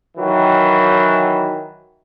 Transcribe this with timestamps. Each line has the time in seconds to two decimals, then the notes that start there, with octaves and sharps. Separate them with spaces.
0.17 D#3 E3 F#3